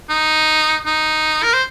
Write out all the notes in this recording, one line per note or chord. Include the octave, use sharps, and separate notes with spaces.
D#4
D#4
A#4
C5